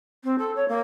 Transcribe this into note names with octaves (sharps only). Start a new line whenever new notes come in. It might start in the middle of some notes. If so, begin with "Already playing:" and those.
C4
A4
C#5
A#3